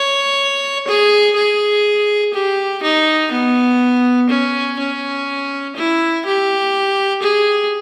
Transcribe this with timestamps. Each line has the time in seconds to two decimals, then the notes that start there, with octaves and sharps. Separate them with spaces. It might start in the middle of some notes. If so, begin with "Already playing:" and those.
Already playing: C#5
0.87 G#4
1.36 G#4
2.34 G4
2.83 D#4
3.32 B3
4.30 C#4
4.79 C#4
5.76 E4
6.25 G4
7.22 G#4